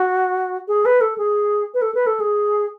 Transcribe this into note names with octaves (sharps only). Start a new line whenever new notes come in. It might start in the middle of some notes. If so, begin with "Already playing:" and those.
Already playing: F#4
G#4
B4
A4
G#4
B4
A4
B4
A4
G#4